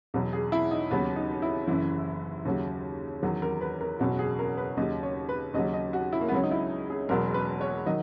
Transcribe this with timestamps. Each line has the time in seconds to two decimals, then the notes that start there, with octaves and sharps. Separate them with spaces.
0.14 E2 B2 F#3
0.33 G#4
0.52 E4
0.71 D#4
0.91 D#2 C#3 F#3 B3
1.16 D#4
1.42 E4
1.68 F#1 F#2 E3
2.45 D#2 C#3 F#3
3.23 E2 D#3 F#3
3.42 A#4
3.61 B4
3.81 A#4
3.99 F#1 E2 B2 F#3 F#4
4.19 G#4
4.39 A#4
4.57 B4
4.77 D#2 C#3 F#3 D#5
5.03 C#5
5.29 B4
5.54 D#2 C#3 F#3 D#5
5.74 D#5
5.93 F#4
6.13 E4
6.21 A#3
6.28 B3
6.32 C#2 C#3 F#3 C#4
6.43 D#4
6.51 E4
6.90 G#4
7.09 E1 E2 B2 F#3 A#4
7.34 B4
7.61 C#5
7.86 D#3 F#3 D#5